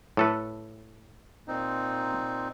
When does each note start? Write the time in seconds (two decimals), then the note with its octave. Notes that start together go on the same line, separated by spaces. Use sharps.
0.17 A2 A4 B4
1.48 A#2 C4 D#4